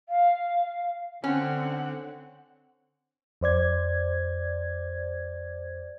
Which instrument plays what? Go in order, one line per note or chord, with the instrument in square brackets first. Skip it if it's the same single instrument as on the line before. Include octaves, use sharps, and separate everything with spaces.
[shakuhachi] F5
[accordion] D3 [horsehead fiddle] C4 F#5 [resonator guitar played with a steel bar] C#4
[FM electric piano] F2 C5 D5 G#6